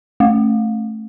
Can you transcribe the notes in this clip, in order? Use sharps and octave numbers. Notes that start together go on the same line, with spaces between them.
A3